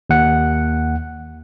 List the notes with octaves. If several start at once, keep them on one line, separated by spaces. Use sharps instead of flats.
D#2 F#5